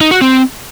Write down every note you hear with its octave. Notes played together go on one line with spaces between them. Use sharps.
D#4
F#4
C4